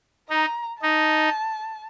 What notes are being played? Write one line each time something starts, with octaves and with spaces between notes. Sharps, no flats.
D#4 A#5
D#4 A5